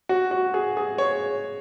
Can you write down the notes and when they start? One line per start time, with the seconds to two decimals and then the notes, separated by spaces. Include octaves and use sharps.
0.09 F#4
0.31 F#4
0.54 G#4
0.77 G#4
0.98 C#5